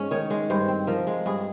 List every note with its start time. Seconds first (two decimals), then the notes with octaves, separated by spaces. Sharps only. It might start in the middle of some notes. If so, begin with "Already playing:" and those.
Already playing: G#2 G#3 C#4
0.11 D#3 C#5
0.30 G#3
0.50 G2 C5
0.68 C4
0.87 F3 A#4
1.07 G#3
1.26 G2 G#4